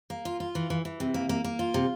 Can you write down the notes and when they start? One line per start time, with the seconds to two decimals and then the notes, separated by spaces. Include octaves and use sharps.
0.10 A#3
0.25 F4
0.40 F4
0.55 E3
0.70 E3
0.85 E3
1.00 C3
1.14 A#3
1.29 A#3
1.44 A#3
1.59 F4
1.74 C3